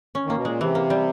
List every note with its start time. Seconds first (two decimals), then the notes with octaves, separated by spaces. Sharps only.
0.15 C#4
0.25 D#2 D#3 A#3
0.36 B2
0.45 A#2 G#3
0.60 C3 E3
0.75 A#3
0.90 G3